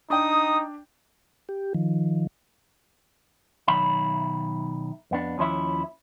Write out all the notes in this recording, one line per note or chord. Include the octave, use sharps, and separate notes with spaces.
D4 D#4 G5 D#6
G4
D#3 F3
B1 D#3 F#3 E5 A#5 B5
F2 B3 D4
D#2 F3 C#4 E4 E5